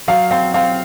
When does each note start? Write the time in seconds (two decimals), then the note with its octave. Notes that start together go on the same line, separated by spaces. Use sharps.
0.08 F#3 F5
0.31 C4 F5
0.54 C4 F5